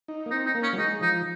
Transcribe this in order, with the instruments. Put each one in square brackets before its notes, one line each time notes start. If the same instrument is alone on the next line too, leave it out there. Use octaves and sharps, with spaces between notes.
[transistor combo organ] D#4
A#3
[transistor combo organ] C4 [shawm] D#4
[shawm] D#4
[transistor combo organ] A#3
[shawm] C#4
[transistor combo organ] F#3
[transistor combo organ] G#3 [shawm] D#4
[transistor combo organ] F3 [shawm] D#4